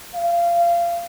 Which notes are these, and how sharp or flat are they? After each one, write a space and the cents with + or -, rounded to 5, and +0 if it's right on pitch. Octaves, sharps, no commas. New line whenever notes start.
F5 -25